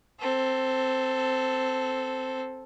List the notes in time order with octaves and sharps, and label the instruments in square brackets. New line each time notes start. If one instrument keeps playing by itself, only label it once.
[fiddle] C4 A4